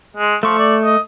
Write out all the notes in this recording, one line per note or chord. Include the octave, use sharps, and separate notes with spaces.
G#3
F3 A3 C#6
D5
D#5